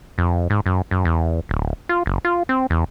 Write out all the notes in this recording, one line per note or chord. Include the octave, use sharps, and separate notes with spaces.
F2
G#2
F#2
F#2
E2
D1
F4
F#1
F4
C4
E2